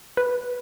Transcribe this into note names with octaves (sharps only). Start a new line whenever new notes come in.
B4